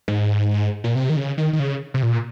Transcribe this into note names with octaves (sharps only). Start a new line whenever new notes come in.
G#2
A#2
C3
D#3
C#3
D#3
D#3
C#3
C3
A#2